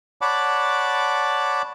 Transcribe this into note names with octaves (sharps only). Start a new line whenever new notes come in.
C#5 D5 F#5 A5 B5 D6